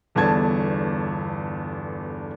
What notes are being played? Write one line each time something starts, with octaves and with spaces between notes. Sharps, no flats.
G1 E2 G2 D3 A5 G#6